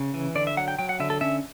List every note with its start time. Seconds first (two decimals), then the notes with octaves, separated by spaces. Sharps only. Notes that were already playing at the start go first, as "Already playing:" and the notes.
Already playing: C#3
0.14 E3
0.35 D3 D5
0.47 E5
0.57 F#3 F#5
0.68 G5
0.79 F#3 G5
0.89 F#5
1.00 D3 E5
1.10 A4
1.21 C#4 E5